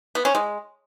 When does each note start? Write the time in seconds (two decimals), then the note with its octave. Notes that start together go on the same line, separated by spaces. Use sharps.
0.15 B3
0.25 C#4
0.35 G#3